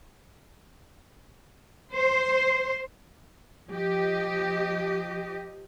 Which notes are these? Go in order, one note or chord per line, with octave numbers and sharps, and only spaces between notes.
C5
F3 G4 D#5